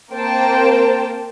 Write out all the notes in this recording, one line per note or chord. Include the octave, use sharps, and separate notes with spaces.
A#3 C4 A#4 C5 G5 A5